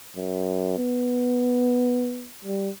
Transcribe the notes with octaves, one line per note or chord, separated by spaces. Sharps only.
F#2
B3
G3